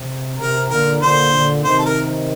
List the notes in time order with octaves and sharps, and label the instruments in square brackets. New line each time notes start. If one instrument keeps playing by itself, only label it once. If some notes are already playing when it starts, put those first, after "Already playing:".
Already playing: [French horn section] C3
[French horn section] C3 [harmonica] A#4
[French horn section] A#2 D3 [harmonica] A#4
[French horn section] A#2 D3 [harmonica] C5
[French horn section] A#2 D3
[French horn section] C3 D#3 [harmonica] C5
[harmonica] A4
A#4